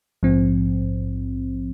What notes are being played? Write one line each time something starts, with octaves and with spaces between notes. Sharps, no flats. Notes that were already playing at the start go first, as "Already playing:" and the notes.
A#1 G#2 F3 C4